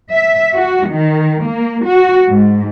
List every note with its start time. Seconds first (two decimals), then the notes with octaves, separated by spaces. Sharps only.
0.12 E5
0.55 F#4
0.89 D#3
1.45 A#3
1.85 F#4
2.30 G#2